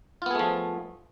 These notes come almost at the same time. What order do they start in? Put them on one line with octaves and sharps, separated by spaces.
F4 B3 G#4 A3 F3